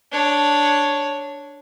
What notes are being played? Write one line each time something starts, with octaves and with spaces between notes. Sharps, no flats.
D4 C#5